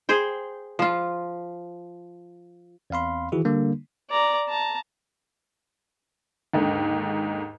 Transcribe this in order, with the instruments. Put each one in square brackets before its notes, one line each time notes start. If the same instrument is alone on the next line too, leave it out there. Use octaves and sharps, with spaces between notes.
[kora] G#4 C5 G5
F3 F4
[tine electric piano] E2 C4 F5 B5 C6
D#3 E3 E4 F#4 G#4
D3 G3 A#3 D4
[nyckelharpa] D5 A#5
A5 A#5
[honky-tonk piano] D#2 G#2 D3